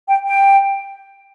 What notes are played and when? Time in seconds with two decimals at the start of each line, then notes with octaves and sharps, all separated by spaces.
0.08 G5
0.27 G5